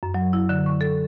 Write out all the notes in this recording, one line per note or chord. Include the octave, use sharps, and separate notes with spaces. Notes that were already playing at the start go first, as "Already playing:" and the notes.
F#2
F#3
E4
D3
C#6
A4